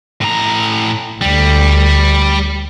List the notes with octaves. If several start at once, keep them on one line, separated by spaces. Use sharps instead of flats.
A2 A#5
D2 G3